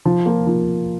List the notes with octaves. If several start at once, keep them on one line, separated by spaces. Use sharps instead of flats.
F3
A#3 F4
F3